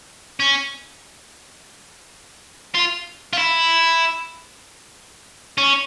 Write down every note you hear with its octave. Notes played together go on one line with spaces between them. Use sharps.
C#4
F4
F4
E4
C#4